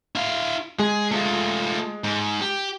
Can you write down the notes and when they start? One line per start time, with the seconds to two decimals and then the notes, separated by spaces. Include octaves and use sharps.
0.15 E4 F5
0.79 G#3 G#4
1.11 A3 F4
2.04 G#2
2.41 G4